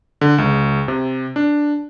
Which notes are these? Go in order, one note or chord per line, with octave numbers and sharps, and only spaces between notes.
D3
C#2
C3
D4